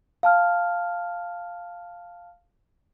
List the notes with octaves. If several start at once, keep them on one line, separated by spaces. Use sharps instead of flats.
F5 A5 F6